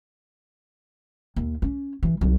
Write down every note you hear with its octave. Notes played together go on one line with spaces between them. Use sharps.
D#2
C#4
E3
C2 F#3